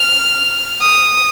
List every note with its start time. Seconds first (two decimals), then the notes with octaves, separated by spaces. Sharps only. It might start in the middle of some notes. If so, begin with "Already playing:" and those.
Already playing: F6
0.81 D#6